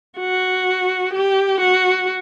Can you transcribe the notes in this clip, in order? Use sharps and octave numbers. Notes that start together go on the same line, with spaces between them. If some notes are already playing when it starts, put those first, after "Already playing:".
F#4
G4
F#4